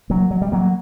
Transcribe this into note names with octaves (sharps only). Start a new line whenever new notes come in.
F#3 A#3
F#3
G3
F#3 A#3